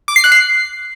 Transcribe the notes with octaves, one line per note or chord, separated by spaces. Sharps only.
D6
C7
F#6
C7